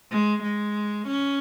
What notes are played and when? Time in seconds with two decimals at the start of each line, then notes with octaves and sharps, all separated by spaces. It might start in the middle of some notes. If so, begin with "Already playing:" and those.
0.11 G#3
0.43 G#3
1.07 C#4